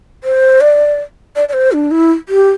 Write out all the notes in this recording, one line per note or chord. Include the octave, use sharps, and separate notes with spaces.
C5
D5
D5
D5
C5
D4
E4
G4